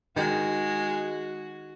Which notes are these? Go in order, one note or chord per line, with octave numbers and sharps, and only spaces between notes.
D#3 G#3 F#4